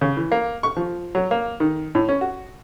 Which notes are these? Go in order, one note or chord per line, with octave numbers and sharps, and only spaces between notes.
C#3
E3
A#3
C#6
F3
F#3
A#3
D#3
A2
C#4
F#4